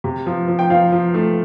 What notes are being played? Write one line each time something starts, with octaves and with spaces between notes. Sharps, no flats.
C3
F3
F3
G5
F3 F5
F3
A3